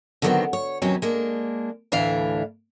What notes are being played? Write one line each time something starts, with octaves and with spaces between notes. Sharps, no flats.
D3 D#3 F#3 G#3 B3 C4
C#5
D#2 C3 E3 F#3 C#4
G#3 A#3 D4
D2 A2 E3 D4 E5 F5